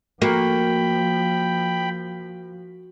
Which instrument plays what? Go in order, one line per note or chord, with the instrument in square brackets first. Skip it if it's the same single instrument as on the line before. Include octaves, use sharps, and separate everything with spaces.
[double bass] F3 [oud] A#3 [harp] F#4 [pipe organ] G5 B5